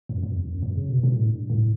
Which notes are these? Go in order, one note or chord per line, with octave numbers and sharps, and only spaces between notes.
F#2
F#2
E2
F#2
F#2
C#3
B2
B2
A2
G2
A2